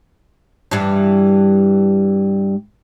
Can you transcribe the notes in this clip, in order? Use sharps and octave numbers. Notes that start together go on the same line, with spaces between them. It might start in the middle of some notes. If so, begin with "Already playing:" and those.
G2 E3 G3